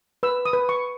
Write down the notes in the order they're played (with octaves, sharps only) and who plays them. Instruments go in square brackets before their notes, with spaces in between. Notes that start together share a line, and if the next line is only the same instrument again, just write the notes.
[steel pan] B4 E6
D#6
B4
C#6